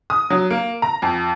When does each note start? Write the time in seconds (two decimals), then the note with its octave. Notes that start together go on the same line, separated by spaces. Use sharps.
0.10 D#6
0.30 F#3
0.50 A#3
0.82 A#5
1.02 F2